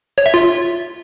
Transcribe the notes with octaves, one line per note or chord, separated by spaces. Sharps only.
C#5
E5
F4